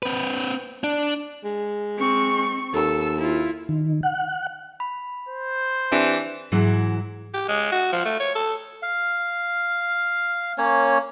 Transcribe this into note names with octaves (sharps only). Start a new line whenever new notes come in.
C4 B4
D4
G#3
C4 C#6
D#2 A4 E6
E4 F4
D#3
F#5
B5
C5
E3 C4 D4 G4
G#2 E3 F#3 E4
G4
G#3
F#4
F3
A3
C#5
A4
F5
A#3 C#4 C#5